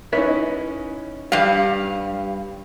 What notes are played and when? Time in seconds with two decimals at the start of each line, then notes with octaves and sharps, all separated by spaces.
0.13 C#4 D#4 E4 B4 C#5 E5
1.32 G2 G3 F5